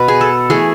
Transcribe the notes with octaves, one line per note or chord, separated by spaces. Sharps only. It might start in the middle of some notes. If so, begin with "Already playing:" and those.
Already playing: B2 B3 B4
G#4
A4
E3 A3 G#4